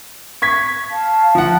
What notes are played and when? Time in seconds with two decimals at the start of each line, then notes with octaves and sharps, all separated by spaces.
0.42 C#6 G#6 B6
0.90 F5 A5
1.35 F3 F#5